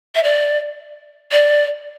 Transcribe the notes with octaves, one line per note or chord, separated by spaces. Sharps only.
E5
D5
D5